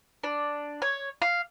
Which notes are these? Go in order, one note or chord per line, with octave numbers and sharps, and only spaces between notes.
D4
C#5
F5